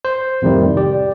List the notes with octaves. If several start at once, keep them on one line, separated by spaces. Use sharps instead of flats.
C5
F2 A2 C3 D#3 G3
G4 D5